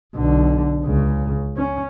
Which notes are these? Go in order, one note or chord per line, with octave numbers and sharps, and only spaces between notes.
B1 D3
C#2 C#3
C#4